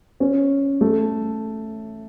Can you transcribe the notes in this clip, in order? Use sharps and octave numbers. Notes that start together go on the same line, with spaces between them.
C#4
A3